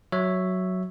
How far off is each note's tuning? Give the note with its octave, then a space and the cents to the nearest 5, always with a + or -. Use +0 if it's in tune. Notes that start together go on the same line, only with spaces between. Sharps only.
F#3 +0 C#5 +0 E5 +0